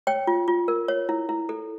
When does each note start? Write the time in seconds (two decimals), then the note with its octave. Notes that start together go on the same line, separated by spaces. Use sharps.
0.07 C#5 G5
0.27 F4
0.48 F4
0.68 A#4
0.88 C#5
1.09 E4
1.29 E4
1.49 A4